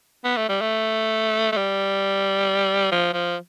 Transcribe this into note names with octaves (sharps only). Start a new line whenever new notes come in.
B3
A3
G3
A3
A3
G3
F3
F3